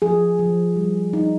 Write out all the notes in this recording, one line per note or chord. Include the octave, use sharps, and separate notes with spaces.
F3 G#4
F3
G3
D#4